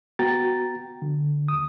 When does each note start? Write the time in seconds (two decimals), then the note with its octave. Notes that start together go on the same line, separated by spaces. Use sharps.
0.19 B3 F#4 G5 A#5 A6
1.02 D3
1.48 D#2 D#6